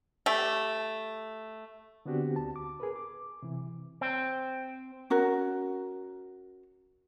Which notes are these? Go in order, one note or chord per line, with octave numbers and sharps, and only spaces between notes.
A3 G4
D3 B3 C4 D4 F#4 G4
D2 A5
D6
G#4 A#4 B4
D6
C3 E3
C4
C#4 F#4 A#4